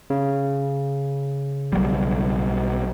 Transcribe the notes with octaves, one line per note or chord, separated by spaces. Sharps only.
C#3
B1 F#3 G3